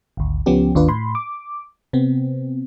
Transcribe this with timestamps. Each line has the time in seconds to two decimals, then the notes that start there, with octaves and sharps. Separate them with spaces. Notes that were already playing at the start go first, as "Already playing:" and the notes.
0.17 G#1 D2
0.46 C#2 F3 B3 C#4 G4
0.75 G#1 D#2 D4 F4 B4
0.88 A2 B5 C6
1.15 D6
1.93 C3 B3 C4